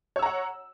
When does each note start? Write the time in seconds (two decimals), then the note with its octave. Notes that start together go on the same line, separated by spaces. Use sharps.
0.16 C#5
0.19 E6
0.22 A#5
0.26 F#5